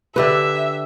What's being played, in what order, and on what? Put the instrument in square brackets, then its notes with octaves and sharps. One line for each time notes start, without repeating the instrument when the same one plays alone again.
[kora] D3 G4 B4 [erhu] E5